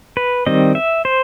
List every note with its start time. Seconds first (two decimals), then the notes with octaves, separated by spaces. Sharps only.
0.17 B4
0.46 D#3 G3 C4 D#5
0.75 E5
1.05 C5